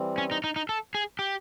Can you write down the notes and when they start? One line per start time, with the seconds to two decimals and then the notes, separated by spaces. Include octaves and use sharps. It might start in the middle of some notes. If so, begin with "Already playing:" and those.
Already playing: E3 G3 C4
0.18 C#4
0.31 D#4
0.44 D#4
0.56 D#4
0.69 A4
0.95 G#4
1.19 G4